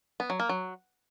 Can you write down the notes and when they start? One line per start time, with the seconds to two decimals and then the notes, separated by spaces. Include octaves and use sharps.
0.20 B3
0.30 F#3
0.40 A#3
0.49 F#3